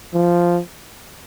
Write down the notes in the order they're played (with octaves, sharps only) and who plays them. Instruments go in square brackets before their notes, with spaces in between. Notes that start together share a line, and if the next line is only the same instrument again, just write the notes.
[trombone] F3